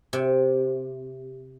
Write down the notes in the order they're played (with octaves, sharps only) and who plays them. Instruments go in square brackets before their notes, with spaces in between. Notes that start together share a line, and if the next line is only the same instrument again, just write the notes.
[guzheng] C3